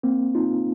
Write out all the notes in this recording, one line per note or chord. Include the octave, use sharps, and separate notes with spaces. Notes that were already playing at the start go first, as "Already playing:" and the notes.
A#3 C4
D#4 F4